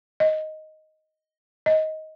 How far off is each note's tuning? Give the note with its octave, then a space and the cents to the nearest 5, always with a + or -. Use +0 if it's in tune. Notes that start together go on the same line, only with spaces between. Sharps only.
D#5 +5
D#5 +15